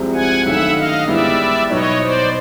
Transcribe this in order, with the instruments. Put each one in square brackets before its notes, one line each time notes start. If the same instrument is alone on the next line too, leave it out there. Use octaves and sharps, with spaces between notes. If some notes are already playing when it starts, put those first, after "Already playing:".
Already playing: [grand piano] C2 C3 F3 G#3 C4
[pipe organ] F#5 G#5
[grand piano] G2 D#3 F#3 A3 C#4 [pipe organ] E5 F#5
[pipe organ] D#5 F5
[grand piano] G#2 E3 G3 B3 E4 [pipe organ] D5 E5
[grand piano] B2 F#3 B3 D#4 [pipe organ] C#5 D#5
[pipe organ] C5 D5